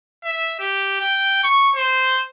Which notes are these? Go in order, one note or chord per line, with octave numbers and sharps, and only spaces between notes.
E5
G4
G5
C#6
C5